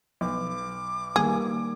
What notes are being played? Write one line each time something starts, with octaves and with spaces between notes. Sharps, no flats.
B1 D6
D#3 G3 A#3 G#4